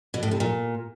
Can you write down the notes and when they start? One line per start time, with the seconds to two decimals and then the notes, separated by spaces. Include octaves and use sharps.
0.14 B2
0.23 A2
0.31 C3
0.40 A#2